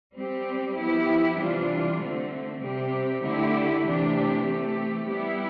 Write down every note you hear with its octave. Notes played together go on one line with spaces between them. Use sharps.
G3 C4 G4
F3 B3 E4 G4
C3 E3 G3 D4 F4
D3 A3 C4
C3 G3 C4 G4
D3 A3 E4 G4
C3 E3 A3 D4 G4
E3 A3 C4 G4
G3 B3 E4 G4